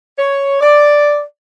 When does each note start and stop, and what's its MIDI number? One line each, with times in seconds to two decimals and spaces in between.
0.18 0.60 73
0.60 1.21 74